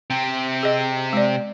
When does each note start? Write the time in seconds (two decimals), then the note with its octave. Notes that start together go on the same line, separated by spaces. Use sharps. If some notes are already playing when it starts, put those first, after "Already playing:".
0.10 C3 C4
0.63 G#4 D#5
1.13 G#3 D5